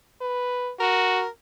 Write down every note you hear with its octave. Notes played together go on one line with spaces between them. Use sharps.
B4
F#4 A#4